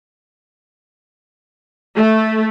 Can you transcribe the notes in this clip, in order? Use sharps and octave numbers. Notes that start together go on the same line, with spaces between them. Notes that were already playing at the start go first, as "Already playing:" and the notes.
A3